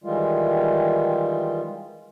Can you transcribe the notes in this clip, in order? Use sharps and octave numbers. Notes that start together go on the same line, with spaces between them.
D#3 E3 G3 G#3 F4